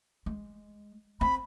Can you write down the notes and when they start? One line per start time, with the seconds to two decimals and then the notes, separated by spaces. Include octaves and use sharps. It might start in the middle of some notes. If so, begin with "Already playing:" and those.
0.26 G#3
1.21 C4 B5